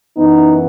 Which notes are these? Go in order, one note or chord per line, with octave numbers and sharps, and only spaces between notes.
F#2 E3 B3 D#4